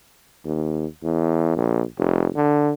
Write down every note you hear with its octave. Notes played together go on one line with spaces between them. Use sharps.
D#2
E2
A#1
F1
D3